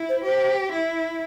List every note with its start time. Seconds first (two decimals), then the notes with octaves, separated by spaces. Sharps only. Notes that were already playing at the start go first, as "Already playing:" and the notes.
Already playing: E4
0.09 C5
0.24 G4 C5
0.72 E4